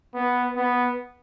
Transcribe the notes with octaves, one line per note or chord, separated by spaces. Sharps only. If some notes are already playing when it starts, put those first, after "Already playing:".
B3
B3